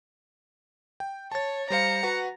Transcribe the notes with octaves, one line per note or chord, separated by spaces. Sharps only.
G5
C#5 A5 A6
G3 C5 F5 A#5 C#7
F#4 B4 F#5